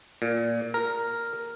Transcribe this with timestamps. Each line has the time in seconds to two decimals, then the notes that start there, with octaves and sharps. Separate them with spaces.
0.22 A#2
0.74 A#4